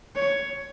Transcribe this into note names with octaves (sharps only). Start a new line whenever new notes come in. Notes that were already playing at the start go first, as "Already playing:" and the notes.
C#5